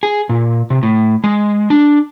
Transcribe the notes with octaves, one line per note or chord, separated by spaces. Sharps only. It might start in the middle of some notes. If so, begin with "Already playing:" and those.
G#4
A#2
C3
A2
G#3
D4